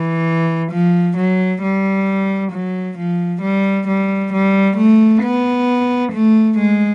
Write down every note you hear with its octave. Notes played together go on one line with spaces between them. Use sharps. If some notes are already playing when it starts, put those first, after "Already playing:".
Already playing: E3
F3
F#3
G3
F#3
F3
G3
G3
G3
A3
B3
A3
G#3